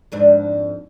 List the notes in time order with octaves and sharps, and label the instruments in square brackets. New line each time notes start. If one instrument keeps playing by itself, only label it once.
[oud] F2 G#2 D4